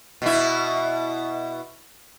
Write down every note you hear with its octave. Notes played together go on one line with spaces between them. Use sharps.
B2 E4